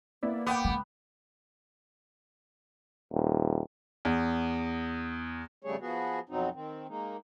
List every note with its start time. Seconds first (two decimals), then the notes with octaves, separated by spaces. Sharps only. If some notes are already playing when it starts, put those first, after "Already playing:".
0.23 A#3 B3 E4 D5
0.47 B3 G5 D6
0.65 C#3 G#3
3.12 D#1
4.05 E2
5.64 F2 C#3 G3 A3 G#4 C#5
5.81 F3 B3 F#4 G#4
6.29 F2 B2 F#3 C4 D#4
6.54 D#3 C4
6.88 G#3 A#3 D#4